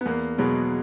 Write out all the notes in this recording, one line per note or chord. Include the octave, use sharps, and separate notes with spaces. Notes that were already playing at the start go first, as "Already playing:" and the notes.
B3
E2 A#3
B2 F#3 G#3